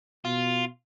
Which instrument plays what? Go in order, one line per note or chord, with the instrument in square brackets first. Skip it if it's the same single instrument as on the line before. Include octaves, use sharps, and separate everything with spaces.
[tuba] B2 [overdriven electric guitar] F4